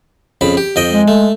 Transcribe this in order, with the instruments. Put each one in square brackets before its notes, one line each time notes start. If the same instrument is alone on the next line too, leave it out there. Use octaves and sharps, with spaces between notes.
[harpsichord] F2 C#3 B5
G4
F2 D#5 G5
[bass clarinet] G#3
[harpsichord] A3